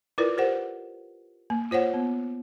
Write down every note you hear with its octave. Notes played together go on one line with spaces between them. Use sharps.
E4 F4 A#4 B4 D5
G4 A#4 C5 F#5
A#3
F4 C5 C#5 F#5
B3